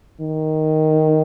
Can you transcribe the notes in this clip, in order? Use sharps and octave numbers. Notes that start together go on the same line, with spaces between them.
D#3